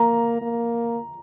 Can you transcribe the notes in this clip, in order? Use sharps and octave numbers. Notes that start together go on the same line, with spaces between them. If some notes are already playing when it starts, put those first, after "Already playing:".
Already playing: A#3 A#5
A#3